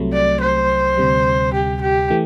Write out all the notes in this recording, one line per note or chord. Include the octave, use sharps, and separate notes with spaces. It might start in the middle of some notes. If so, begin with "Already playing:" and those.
Already playing: C2 C3 F#3 A3
D5
C5
D2 C3 G3
G4
G4
E3 A3